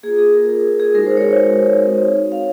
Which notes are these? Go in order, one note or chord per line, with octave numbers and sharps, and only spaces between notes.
A#3 F4 G#4
G#4
A#4
G#4
G#4
G#3 D#4 F#4 A#4
C5
C#5
C#5
C4 D#4 F#4
F5